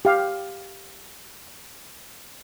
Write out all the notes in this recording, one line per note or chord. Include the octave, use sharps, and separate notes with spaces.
G4 F5